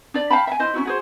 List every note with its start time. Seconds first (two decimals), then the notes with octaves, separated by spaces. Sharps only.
0.14 D4 D5
0.30 F5 G5 A5 B5
0.47 E5 G#5
0.59 E4 C5 D#5
0.74 C#4 D#4 E4 F#4
0.85 F#4 G#4 C5